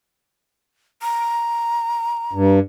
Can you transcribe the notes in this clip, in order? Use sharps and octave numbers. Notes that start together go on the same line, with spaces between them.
A#5
G2